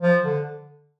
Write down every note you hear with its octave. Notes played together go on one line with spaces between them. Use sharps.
F3
D3